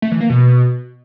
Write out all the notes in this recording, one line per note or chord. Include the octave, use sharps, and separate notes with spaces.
A3
E3
A#3
B2